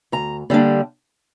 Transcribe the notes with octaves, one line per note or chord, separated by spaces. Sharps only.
D2 A#5
D3 G3 A#3 D4